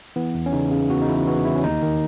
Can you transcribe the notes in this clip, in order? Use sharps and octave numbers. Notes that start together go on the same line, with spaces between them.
E3 B3
E2
C#4
C#3 D#4
C#3
E2 F#4
D#4
E3 E4
E3 F#4
E2 E4
C#4
D#2 D#4
D#3